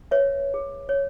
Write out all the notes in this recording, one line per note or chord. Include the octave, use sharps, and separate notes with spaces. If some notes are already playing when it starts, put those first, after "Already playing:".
B4 C#5 E5
G#4
C#5